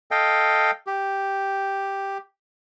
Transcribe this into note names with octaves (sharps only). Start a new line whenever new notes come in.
A4 D#5 F5 G5
G4